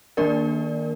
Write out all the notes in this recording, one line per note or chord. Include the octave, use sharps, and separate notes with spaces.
D#3 A#3 D4 A#4 D5